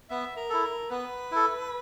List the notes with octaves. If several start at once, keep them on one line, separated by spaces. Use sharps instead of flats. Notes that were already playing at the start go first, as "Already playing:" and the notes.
B3 E5
A#4
E4 A4
A#4
B3 B4
E4 A4